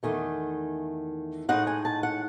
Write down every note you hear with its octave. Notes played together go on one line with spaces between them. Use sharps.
E2 D#3 A3 D#4 G#5
A2 G#3 D#4 F#5
G#5
A5
F#5